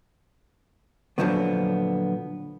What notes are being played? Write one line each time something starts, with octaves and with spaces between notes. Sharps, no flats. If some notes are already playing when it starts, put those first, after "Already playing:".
A#2 D3 D#3 F3 F#3 B3